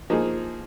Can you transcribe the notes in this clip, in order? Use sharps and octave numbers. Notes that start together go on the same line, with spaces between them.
F3 A#3 D#4 G#4